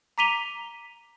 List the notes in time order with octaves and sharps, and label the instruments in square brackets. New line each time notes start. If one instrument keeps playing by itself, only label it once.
[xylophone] A#5 D6 B6 D#7 F7 G7